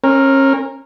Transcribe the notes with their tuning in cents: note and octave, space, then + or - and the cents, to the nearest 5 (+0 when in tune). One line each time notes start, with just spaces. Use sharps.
C#4 -35 A#4 +0